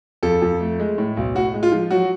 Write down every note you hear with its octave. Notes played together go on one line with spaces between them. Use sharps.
F2 A4
F2
A3
G#3
A2
B1
A2 F#4
G#3
F4
F3
F#3 F#4